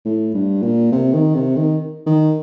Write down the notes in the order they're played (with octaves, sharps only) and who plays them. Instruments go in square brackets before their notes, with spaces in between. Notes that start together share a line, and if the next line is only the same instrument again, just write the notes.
[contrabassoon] A2
G2
A#2
C3
D#3
C3
D#3
D#3